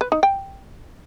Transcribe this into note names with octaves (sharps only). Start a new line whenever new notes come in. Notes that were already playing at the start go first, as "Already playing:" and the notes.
B4
D#4
G5